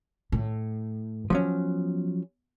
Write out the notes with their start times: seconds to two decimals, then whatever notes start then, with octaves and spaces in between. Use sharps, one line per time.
0.32 A2
1.30 F3 F#3 B3 C#4